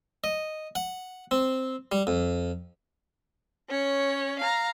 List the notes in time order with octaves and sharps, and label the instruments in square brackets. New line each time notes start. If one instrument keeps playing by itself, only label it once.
[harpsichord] D#5
F#5
C4
G3
F2
[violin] C#4 C#5
F5 A#5